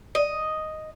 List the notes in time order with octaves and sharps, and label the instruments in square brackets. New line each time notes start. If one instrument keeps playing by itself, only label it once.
[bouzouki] D#5